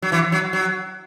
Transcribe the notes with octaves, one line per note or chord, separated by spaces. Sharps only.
F#3
E3
F#3
F#3